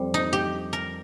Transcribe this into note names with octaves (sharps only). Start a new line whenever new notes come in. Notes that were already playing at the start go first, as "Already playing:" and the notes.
Already playing: F2 G3
D#4
G4
A#4